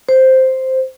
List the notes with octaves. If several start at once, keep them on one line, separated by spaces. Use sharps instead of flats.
C5